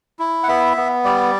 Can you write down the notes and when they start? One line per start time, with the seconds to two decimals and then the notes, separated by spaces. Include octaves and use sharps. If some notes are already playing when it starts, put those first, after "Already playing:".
0.19 E4
0.43 F#5
0.48 B3 E5
0.77 B3
1.04 G3 D5